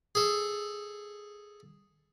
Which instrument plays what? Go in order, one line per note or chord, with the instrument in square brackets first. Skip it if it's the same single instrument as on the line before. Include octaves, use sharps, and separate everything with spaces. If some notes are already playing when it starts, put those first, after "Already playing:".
[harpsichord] G#4 A4